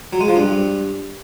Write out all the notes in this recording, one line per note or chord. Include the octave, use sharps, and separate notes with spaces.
F#3
G#3
F3
G2